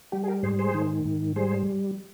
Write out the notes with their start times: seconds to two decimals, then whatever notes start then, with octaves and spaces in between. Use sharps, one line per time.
0.12 G3 G4
0.24 G#4
0.27 G4 A#4
0.43 G#2 G#4 C5
0.59 G#4 C5
0.74 D#3
1.05 G#2
1.36 G3 G#4 C5